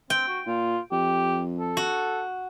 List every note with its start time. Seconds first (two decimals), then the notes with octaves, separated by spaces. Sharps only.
0.10 C4 G5
0.28 F#4
0.47 A#2 F4
0.92 F2 G4
1.58 A4
1.77 F#4